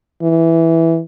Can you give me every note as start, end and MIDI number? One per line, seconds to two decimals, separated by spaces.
0.22 1.00 52